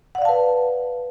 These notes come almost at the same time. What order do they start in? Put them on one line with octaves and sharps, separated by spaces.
F#5 D5 F5 A5 B4